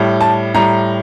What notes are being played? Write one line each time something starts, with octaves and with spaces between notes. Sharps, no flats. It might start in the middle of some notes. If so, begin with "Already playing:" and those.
Already playing: A2 G3
A5
A2 G3 A#5